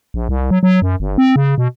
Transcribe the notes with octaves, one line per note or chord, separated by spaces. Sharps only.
A#1
C2
F#3
F#3
F#2
G1
C4
C#3
B2